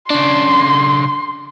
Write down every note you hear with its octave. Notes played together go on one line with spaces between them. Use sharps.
C#3 D4 C6